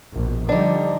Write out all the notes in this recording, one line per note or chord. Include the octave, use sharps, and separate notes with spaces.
A#1 B2
D3 F3 G3 D4 D#4